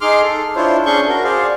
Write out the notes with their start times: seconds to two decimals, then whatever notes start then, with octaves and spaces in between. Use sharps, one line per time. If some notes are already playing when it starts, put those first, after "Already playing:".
0.01 D#4 G#4 C6 D6 F6
0.23 A4
0.56 D4 E4 F4 C5 C#5
0.86 C#4 D4 G#4 C#6 G6
1.08 F#4 A#4
1.24 G#4 C5 D5 F5